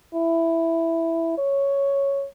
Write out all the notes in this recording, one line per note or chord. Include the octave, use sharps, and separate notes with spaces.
E4
C#5